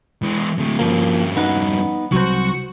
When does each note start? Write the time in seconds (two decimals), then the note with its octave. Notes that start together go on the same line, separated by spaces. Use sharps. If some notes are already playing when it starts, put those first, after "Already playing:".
0.23 E3 G#3
0.59 A2 D3
0.79 G2 F3 A#3 C#4
1.36 B3 D#4 F#5
2.12 C2 F#3 F#4 C5 F#5